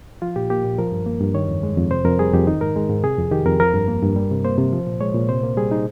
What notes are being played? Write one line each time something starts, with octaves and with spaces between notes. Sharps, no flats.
F3 F4
A#2 G4
A#3 G4
A#2
F3 A#4
G2
A#3
G2
D#3 C#5
F2
G#3
F2
C3 C5
F2 A#4
G3 G#4
F2 G4
D#3 D#4
G#2 A#4
G#3
G#2
C3 G#4
F2
D#3 G4
F2 A#4
F3 A#4
G2
A#3
G2
G3
C3
A#3 C5
C3
F3
A#2
G#3 C#5
A#2
C3 C5
A#3
G3 G#4
D#4